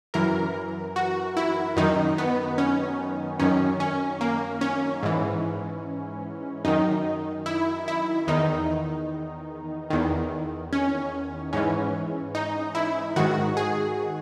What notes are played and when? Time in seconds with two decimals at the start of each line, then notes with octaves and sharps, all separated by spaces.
0.14 F#2 E3 A#4
0.96 F#4
1.37 E4
1.77 F#2 D#3 D#4
2.18 B3
2.58 C#4
3.40 F#2 D#3 C#4
3.80 C#4
4.21 A#3
4.61 C#4
5.03 G#2 E3
6.65 F#2 D#3 D#4
7.46 E4
7.88 E4
8.27 E2 D#3 D#4
9.90 E2 D#3
10.73 C#4
11.53 G#2 E3 C#4
12.35 D#4
12.75 E4
13.16 G#2 D#3 F#4
13.57 G#4